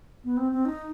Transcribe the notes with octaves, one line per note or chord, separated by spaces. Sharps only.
B3
C4
C4
D#4